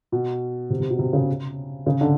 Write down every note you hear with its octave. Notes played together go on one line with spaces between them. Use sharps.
B2
C3
C3
B2
C3
C#3
C#3
D3